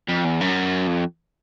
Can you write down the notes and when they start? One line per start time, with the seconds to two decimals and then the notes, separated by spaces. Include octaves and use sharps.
0.09 F2
0.25 E2
0.41 F#2
0.87 F2